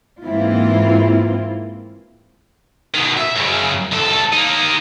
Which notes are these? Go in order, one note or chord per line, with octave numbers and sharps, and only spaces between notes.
G#2 E3 A#3 C4 E4 F4
B2 D#3
E5
F#2 C#3
C2 A4
A#3 D#4